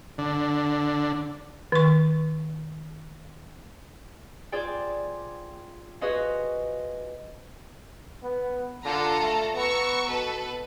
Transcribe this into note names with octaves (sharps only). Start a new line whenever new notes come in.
D3
D#3 C#6
F4 G#4 C5 D5 G5
F#4 G#4 B4 C5 D#5 F5
B3
D3 F4 A4 A#5
A3
B3 A#5 C#6 E6
B2 A4 B4